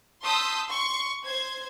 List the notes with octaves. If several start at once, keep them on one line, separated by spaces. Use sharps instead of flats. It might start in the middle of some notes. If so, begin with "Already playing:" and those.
A5 C6 D#6 E6 G6 B6
C6 C#6 C#7
C5 G#6